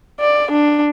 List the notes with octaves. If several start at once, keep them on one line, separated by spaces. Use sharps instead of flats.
D5
D4